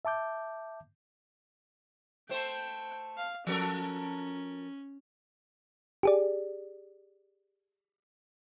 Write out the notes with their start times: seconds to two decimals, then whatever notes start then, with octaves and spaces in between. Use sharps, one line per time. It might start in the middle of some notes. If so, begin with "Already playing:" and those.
0.05 E5 A5 D6 G6
2.29 A3 C5 G5
3.17 F5
3.47 F3 C#4 A4 A#4
6.03 G4 G#4 D5